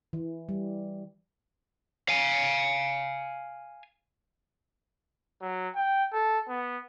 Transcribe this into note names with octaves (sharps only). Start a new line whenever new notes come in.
E3
G3
F5 G#5
F#3
G5
A4
B3